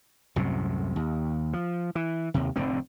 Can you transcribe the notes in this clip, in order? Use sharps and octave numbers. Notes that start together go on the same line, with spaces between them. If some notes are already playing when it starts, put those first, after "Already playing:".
C2 F#2 A2 C3
D#2
F3
E3
D#2 C3
F1 A2 D3 C4